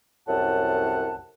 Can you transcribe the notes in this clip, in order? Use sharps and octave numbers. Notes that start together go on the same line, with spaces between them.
C2 F#2 A2 F#5 A5